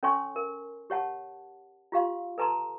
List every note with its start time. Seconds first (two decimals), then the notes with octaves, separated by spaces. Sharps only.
0.03 C#4 A4 C#5 G#5 C6 C#6
0.36 A#4
0.90 G4 C#5 F#5 A5
1.92 F4 G4 F5 C6
2.38 A4 B4 A5 A#5 C6